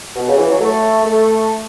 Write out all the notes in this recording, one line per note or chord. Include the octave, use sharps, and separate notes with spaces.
B2
C#3
E3
F#3
A3
A3